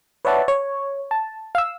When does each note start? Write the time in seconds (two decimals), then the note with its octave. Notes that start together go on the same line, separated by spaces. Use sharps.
0.25 B4 C#5 D5 E5 F#5 A5
0.48 C#5
1.11 A5
1.55 F5 E6